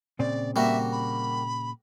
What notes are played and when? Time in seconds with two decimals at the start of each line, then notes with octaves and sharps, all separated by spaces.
0.19 A#2 C#3 C4 D5
0.56 G3 A#3 F#4 E5
0.92 B5